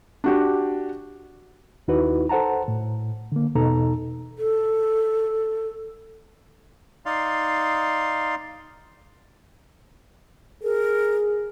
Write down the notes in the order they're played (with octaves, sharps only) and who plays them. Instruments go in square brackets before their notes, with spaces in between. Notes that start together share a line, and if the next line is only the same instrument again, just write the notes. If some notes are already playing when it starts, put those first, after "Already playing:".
[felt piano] D4 F#4 G4
[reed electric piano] D#2 D#4 E4 F#4 B4
A4 C5 F#5 A5 A#5
A2
D3 A#3
E2 B2 D#4 A4 A#5
[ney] A4
[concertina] D#4 D5 F5 C6
[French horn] G#4 [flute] A#4